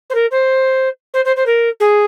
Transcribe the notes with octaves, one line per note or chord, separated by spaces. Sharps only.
C5
A#4
C5
C5
C5
C5
A#4
G#4